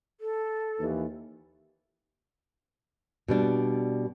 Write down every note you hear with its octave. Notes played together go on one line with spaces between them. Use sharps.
A4
D#2 E3
B2 G3 D4